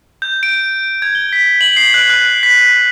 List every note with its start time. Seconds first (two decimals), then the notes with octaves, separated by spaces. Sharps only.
0.22 G6
0.43 D7
1.02 G#6
1.15 G7
1.33 B6
1.61 F#7
1.77 C7
1.94 F#6
2.10 F#6
2.43 B6